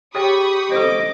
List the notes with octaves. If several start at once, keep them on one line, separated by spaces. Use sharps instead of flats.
G4 G#4 C#5 G5 B5 C#6 D#6
A4 C5 D#5 D6